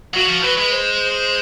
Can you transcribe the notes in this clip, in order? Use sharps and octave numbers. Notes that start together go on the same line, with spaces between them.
F#3 F#4
F3
F#3 B4
G#3
C5